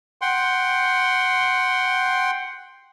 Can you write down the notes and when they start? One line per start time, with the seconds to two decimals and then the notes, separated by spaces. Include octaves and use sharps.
0.21 F#5 G5 C6